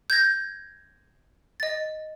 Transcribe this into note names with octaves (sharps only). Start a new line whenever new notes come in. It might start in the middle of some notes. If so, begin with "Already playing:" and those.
G6 G#6 A#6
D#5 A6